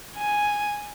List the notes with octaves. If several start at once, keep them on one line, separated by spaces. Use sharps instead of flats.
G#5